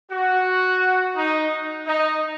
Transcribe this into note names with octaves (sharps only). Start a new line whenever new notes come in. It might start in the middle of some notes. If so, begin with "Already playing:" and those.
F#4
D#4
D#4